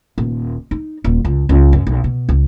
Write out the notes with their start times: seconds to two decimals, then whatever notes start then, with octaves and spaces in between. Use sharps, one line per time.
0.18 D#1
0.71 D#4
1.04 D#1
1.25 C#2
1.49 C#2
1.73 F#2
1.87 B1
2.04 B2
2.29 C#2